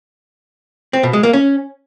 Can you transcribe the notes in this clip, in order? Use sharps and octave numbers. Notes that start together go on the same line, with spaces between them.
C4
B2
G#3
A#3
C#4